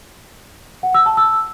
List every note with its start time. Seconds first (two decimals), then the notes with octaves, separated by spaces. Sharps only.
0.83 F#5
0.94 E6
1.06 A5
1.17 E6